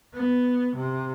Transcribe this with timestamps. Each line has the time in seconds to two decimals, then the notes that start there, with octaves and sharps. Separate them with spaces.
0.14 B3
0.76 C3